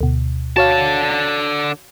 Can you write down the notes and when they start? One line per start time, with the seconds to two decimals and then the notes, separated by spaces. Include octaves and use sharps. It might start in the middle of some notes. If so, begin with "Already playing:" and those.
0.01 D2 B2
0.57 D3 F#4 C#5 F5 A5